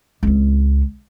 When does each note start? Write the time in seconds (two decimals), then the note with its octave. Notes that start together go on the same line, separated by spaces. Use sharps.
0.23 C#2 C4